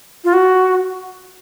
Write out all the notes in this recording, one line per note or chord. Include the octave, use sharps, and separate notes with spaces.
F4
F#4